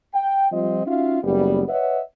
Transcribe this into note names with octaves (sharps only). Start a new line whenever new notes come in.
G5
F3 G3 C4 F4 D#5
C#4 D#4 F4 F#4 E5 F5
F#1 G3 B3
B4 C#5 D#5 E5 F#5